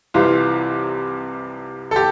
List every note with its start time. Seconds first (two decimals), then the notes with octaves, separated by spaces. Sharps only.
0.14 C2 C3 E3 F4
1.91 A4
1.96 G4